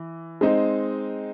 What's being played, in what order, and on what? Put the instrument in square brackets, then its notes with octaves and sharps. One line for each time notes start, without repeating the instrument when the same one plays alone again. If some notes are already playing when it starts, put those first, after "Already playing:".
Already playing: [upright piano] E3
G#3 C4 D#4